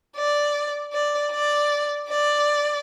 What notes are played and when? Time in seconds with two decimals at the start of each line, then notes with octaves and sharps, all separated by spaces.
0.16 D5
0.93 D5
1.32 D5
2.09 D5